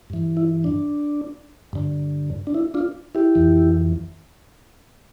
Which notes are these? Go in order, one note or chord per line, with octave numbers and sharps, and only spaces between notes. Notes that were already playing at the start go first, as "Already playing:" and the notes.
G2 E3
E4
D4
G2 D3
D4
E4
D4 F4
E4 G4
F2 E3